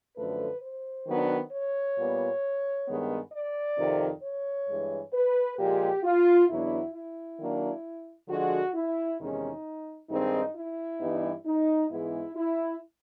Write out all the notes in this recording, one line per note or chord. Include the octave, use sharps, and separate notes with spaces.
F#2 D3 F3 A3 B4
C5
D#3 F#3 B3 D4
C#5
A#2 G3 B3
G2 D#3 G#3 B3
D5
F2 C3 D#3
C#5
G2 E3 G#3
B4
A#2 F3 G#3 G4
F4
E2 B2 F#3 B3 D4 E4
E4
D#3 F#3 A#3 D4
D3 F3 G#3 F#4
E4
E2 C3 D#3 G#3 C#4 D#4
G2 D#3 G#3 C4 D#4
E4
G2 E3 G3 B3 D#4
D#4
G#2 E3 G#3 B3 E4
E4